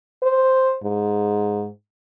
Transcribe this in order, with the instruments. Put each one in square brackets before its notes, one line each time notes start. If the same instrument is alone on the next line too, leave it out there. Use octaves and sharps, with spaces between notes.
[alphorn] C5
G#2